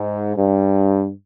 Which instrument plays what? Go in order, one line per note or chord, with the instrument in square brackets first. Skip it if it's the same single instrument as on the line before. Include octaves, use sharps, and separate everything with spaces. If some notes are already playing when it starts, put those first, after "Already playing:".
Already playing: [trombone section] G#2
G2